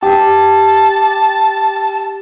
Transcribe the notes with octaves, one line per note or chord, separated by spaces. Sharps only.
G4 A5